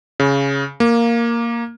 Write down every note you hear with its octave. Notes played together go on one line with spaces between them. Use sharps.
C#3
A#3